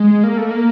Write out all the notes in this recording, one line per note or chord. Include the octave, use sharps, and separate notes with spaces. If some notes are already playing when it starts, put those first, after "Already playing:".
Already playing: G#3
A#3
A3
A#3